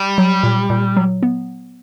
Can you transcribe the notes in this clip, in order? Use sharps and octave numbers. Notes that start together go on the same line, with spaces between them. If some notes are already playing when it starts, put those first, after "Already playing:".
Already playing: G3
F#3
A#2
A#2
F#3
B3